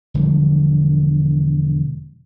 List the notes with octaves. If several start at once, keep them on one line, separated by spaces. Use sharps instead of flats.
E1 D3 F3 G3